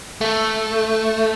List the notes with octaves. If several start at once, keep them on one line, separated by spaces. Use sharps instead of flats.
A3